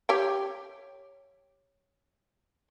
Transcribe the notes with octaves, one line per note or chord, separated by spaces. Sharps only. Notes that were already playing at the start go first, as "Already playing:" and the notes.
G4 C#5 G5